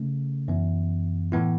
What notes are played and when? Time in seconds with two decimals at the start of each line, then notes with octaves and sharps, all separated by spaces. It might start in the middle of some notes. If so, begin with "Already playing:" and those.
Already playing: C#3 A3 C#4
0.48 F#2 E3 B3
1.32 A2 E3 B3 E4